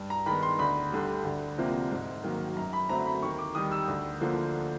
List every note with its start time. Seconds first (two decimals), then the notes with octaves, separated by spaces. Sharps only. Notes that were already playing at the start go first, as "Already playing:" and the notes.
Already playing: G2
0.10 A#5
0.26 D#3 G#3 B3 B5
0.43 C6
0.59 D2 B5
0.92 D3 G3
1.25 D2
1.58 C3 F3 A#3
1.91 G#2
2.24 D#3 F#3 A#3
2.57 F#2 A#5
2.73 B5
2.89 D3 F#3 A3 C4 A#5
3.06 B5
3.22 D#2 C#6
3.39 D6
3.55 D#3 G3 D#6
3.72 E6
3.88 D2
4.21 D3 F3 A#3